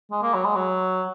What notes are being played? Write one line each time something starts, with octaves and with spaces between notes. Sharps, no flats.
G#3
A#3
F#3
G#3
F#3